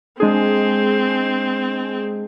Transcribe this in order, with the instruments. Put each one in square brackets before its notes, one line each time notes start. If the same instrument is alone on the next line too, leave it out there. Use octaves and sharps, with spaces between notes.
[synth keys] G#3 D4 G#4 [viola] C4